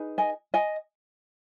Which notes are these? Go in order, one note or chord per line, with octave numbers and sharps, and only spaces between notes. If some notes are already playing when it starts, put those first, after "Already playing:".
Already playing: D#4 G#4 B4
D#5 G#5
D#5 G#5